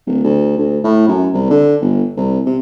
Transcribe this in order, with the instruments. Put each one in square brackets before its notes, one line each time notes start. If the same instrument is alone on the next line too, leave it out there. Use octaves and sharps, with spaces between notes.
[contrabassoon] D1
D2
D2
A2
F#2
C2
D3
G1
C2
C3